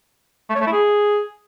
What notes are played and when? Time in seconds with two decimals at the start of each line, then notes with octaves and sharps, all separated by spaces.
0.50 A3
0.55 C#5
0.61 A3
0.67 E4
0.72 G#4